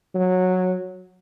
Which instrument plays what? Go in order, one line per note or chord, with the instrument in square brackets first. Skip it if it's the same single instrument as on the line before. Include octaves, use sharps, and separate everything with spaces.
[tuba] F#3